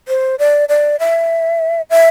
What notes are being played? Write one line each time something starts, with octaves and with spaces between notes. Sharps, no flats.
C5
D5
D5
E5
E5